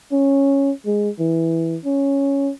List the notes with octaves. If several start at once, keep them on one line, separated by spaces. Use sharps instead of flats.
C#4
G#3
E3
C#4